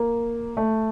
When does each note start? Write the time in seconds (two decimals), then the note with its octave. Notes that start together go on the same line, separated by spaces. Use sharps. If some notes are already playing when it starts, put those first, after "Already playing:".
Already playing: A#3
0.57 A3